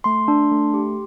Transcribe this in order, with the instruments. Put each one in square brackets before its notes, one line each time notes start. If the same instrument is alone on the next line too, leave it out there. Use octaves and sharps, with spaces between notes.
[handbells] A3 C6
D4
A3
G4